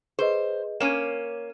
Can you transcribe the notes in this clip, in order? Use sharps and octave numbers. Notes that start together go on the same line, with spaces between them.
G#4 B4 C5 D#5
A#3 C#4 D#7 E7